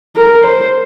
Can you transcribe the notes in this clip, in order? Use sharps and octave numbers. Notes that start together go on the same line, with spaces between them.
A#4
C5